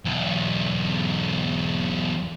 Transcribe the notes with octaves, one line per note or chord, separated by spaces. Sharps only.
B1 E2